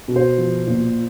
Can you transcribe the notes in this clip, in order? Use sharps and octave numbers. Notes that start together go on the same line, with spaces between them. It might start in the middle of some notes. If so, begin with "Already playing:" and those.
B2
C5
F3
A#2